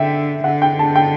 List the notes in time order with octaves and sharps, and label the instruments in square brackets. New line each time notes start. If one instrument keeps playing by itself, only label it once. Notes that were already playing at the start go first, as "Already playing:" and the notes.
Already playing: [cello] D3 [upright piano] E5 G5
[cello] D3 [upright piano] F#5
[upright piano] G5
A5
G5